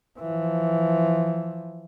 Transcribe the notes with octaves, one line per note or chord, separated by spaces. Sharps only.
E3 F3